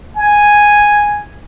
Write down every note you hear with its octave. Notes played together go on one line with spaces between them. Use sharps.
G#5